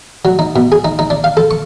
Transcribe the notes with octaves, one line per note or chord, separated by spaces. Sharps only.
F#3
D#4
B2
G#4
D#4
D#4
D4
F5
A4
C#6